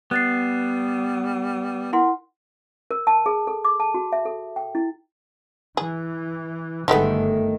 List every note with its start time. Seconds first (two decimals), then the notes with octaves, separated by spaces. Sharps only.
0.11 G3 B3 F#6 A6 C7
1.93 E4 A#4 F#5 C6
2.91 A#4
3.07 A5
3.26 G#4
3.47 A4
3.65 D6
3.80 A5
3.94 F#4
4.12 E5
4.26 A4
4.56 G5
4.75 E4
5.77 E3 G#4
6.88 G1 D#3 F3 G#3 A3 B3